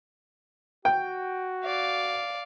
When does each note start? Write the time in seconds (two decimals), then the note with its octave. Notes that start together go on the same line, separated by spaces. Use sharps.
0.85 F#4 G5
1.63 D5 F5